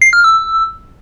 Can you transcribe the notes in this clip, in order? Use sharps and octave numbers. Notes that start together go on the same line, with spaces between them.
C7
F6
E6